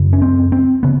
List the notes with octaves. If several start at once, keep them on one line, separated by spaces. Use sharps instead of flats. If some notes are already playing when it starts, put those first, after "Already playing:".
Already playing: F#2 C#3
C#4
C4
C4
C#3 B3